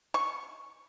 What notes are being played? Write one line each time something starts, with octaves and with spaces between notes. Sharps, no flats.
C#6